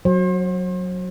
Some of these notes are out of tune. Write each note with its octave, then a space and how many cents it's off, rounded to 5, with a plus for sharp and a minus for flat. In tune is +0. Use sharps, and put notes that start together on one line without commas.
F#3 -10 C5 +40